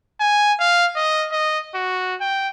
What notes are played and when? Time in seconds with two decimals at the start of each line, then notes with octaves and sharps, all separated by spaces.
0.21 G#5
0.60 F5
0.96 D#5
1.32 D#5
1.75 F#4
2.21 G5